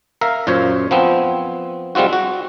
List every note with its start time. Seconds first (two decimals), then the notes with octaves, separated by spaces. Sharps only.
0.21 A#4 E5 F5
0.47 F#2 A#2 F4 C5 C#5
0.91 F3 B3 C4
1.95 G3 G#3 C4 F4 F#4
2.13 F#4